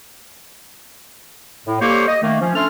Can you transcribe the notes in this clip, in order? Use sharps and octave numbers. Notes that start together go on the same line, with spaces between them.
A2
G3 A#3 G4 A4 C5 C#5
D#5
D#3 A3 A#3
F3 C#4
A3 C#4 D4 A4 C6 F6